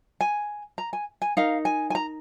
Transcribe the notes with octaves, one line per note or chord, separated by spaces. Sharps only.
G#5
A#5
G#5
G#5
D#4 A#4 F5
G#5
G#5
A#5